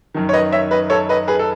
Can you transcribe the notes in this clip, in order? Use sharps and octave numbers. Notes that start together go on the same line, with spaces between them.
F#2 D#3
C#5
B4 D#5
C#5 E5
B4 D#5
A4 C#5
B4 D#5
G#4 B4
A4